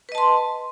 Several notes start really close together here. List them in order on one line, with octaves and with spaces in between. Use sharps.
B4 D#5 A5 C6